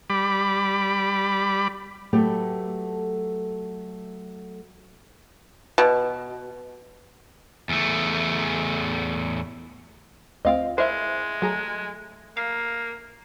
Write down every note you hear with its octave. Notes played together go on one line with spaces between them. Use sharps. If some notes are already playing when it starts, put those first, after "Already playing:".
G3 B5 D6
F#3 A3 G4 A4 B4
B2
E2 A3
D2 C4 F4 D#5 F5 G5
G#3 E4 A#4 C5 E5
F#3 A3 G#4 A#5
A#3 F5